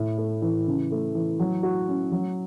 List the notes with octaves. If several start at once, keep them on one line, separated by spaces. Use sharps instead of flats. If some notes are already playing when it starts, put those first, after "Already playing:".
Already playing: A2
A3
E3
C#3
A3
E3
F#3
F#4
C#4
F#3